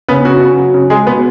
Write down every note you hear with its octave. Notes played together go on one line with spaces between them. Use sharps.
C#3 B3 B4
C#3 F#4
C#3
F#3
C#3
G#3 G#4
B2 B3 B4